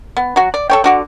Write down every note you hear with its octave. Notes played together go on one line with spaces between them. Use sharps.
B3
F#3 F#4
D5
A4 C#5 G5
D3 F#4 D5